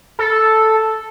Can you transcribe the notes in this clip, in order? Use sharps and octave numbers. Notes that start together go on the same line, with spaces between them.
A4